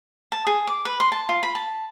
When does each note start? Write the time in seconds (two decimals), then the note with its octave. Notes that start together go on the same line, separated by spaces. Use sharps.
0.32 A5
0.47 G#4
0.67 D6
0.85 B4
1.00 C6
1.12 A5
1.29 F4
1.43 B5
1.55 A5